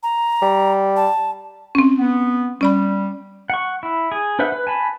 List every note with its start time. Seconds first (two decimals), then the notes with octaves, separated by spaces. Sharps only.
0.03 A#5
0.42 G3
0.96 A5
1.75 C4 C#4
1.99 B3
2.61 G3 C#4 D5 B5
3.50 F#5 C#6
3.83 E4
4.12 G#4
4.39 D4 B4 C5 E5 F#5
4.52 B4
4.67 G#5 A5 B5